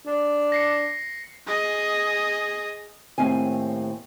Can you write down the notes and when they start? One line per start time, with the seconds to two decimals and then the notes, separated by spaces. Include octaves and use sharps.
0.06 D4
0.52 A#6 C7 C#7
1.47 G#4 D#5
3.18 D#2 A2 C4 G#5